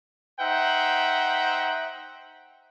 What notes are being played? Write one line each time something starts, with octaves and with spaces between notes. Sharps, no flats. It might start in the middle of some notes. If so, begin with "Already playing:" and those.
D#4 C5 E5 F#5 G5